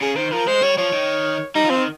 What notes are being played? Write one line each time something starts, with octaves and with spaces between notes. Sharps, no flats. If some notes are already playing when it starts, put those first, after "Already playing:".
C#3 G#4
D#3 C5
F3 A#4
G#3 C5
G3 C#5
F3 C#5
D#3
G3 D#4
F3 C4
D#3